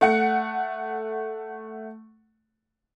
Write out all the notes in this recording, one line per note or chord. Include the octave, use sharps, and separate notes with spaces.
A3 F#5 C#7